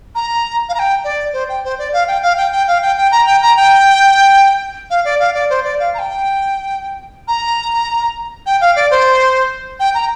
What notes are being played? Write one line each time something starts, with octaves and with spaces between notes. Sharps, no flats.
A#5
F5
A#5
G5
D5
C5
G5
C5
D5
F5
G5
F5
G5
G5
F5
G5
G5
A#5
G5
A#5
G5
F5
D5
F5
D5
C5
D5
F5
A#5
G5
A#5
G5
F5
D5
C5
G5
A#5